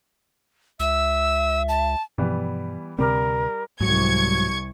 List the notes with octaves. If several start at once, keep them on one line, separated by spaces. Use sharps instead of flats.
C#2 E5 E6
A5
G2 B2 E3 F3 G3 B3
D2 C3 G3 C4 A#4 D6 F6
C2 G#2 F#3 C#6 G#6